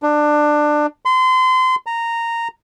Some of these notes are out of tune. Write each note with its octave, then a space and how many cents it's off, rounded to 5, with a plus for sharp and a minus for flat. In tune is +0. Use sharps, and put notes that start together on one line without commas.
D4 +20
C6 -30
A#5 -10